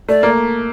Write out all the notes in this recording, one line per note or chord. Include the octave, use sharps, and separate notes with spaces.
A3 D5
A#3